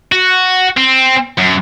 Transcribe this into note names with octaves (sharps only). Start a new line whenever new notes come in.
F#4
C4
F#2